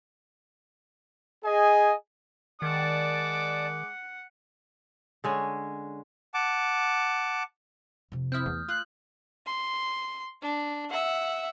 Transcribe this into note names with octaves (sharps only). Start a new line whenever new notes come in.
G#4 D#5 G#5
D#3 G#3 D5 F#5 A5 D6
D3 G#3 C#4 C#5
F#5 A5 D6
F2 C3
C4 E4 D#6 F6 G6
E2 A3
F4 F#6
C6
D4
E5 F#5